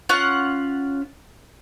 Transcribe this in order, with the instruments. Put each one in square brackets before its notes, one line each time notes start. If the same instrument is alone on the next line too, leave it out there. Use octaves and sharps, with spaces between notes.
[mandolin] C#4 F4 F#5